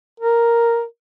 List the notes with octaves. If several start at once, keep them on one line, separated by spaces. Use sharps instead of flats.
A#4